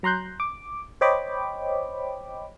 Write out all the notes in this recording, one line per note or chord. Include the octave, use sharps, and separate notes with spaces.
F#3 A#5 C6 F#6 G6
D6
C5 C#5 D#5 G5 B5 D6